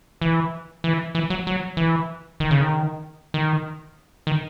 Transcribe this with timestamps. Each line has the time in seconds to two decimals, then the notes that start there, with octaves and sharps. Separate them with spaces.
0.21 E3
0.84 E3
1.15 E3
1.30 F#3
1.47 F#3
1.77 E3
2.40 D#3
2.51 C#3
2.61 D#3
3.34 D#3
4.27 D#3